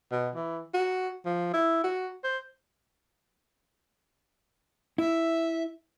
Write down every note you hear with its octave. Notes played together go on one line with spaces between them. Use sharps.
B2
E3
F#4
F3
E4
F#4
C5
E4 E5